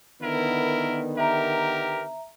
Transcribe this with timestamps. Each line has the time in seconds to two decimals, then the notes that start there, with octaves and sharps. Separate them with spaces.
0.22 D3 D#3 B3 E4 A#4
1.17 G4 A#4 E5 A#5